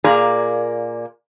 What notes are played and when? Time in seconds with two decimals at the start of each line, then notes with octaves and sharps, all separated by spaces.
0.04 A#2 A#3 G#4 D5 A#5